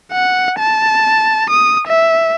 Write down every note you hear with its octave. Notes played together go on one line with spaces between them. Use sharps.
F#5
A5
D#6
E5